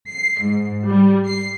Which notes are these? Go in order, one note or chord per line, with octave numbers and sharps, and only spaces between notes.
C7
G#2
G3
C7